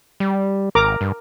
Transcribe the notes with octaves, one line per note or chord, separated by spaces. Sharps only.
G3
G#1 A#4 A#5 D6
G2